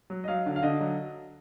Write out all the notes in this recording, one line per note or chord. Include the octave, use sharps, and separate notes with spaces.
F#3
D#5
F#3 F5
D3
F5
D3 D#5
F#3